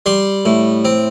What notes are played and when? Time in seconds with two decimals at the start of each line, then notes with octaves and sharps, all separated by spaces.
0.06 G3 C6
0.46 A2
0.85 C4